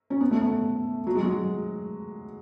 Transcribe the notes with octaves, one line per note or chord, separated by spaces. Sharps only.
C#4
B3
A3
B3
F#3
G#3
F#3